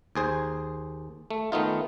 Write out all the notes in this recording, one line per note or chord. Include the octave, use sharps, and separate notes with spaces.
D#2 G#4 C5
A3
D#3 A3 B3 D#4 F4